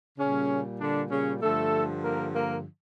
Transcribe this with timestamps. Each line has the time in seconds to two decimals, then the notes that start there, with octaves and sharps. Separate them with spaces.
0.17 A#2 C#3 G3 C#4
0.80 D3 D4
1.10 C#3 C#4
1.41 G2 D3 F3 A3 A4
2.03 A#3 A#4
2.34 A#3 A#4